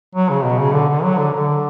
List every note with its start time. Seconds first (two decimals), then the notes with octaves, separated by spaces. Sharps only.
0.15 F#3
0.30 C#3
0.45 B2
0.59 C#3
0.74 D3
0.89 D3
1.03 F#3
1.18 D3
1.33 D3